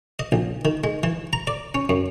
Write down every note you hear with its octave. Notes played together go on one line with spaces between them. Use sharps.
D#5
A#1
D#3
G#3
E3
A#5
D5
C#4
F#2